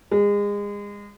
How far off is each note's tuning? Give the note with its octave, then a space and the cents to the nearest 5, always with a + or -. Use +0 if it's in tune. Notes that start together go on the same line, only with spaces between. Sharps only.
G#3 -30